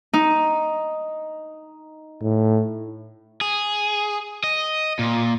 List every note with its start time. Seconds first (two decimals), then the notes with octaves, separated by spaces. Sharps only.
0.13 D#4
2.22 A2
3.41 G#4
4.44 D#5
4.99 A#2